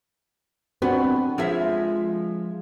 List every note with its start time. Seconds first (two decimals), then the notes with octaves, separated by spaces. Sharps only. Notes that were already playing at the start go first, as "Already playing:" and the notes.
0.82 B3 C4 D4 F#4
1.38 F3 G#3 E5